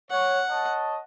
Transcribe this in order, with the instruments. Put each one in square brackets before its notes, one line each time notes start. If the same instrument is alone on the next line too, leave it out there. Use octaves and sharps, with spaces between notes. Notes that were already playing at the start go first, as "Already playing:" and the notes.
[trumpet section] C#5 [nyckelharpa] F#5
[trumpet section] C#5 D#5 A5